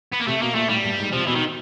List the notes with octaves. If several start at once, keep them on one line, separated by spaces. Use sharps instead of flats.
B3
A#3
C3 A3
B2 A#3
A#2 A3
A2 G3
G2
G#2
C3 F3
B2 E3
D#3